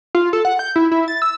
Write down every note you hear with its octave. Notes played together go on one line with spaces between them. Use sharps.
F4
A4
F#5
G6
E4
E4
A6
E6